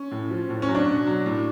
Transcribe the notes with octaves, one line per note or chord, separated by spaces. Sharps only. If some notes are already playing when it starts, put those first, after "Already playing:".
Already playing: C#4
A2
F3
A2
C#4
F#3
D4
B2
F#3
A2